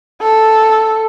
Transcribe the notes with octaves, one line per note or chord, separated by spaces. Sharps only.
A4